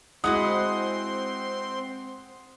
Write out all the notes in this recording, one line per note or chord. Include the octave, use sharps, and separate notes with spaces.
G#3 C4 E4 F#4 F#5 C6 D#6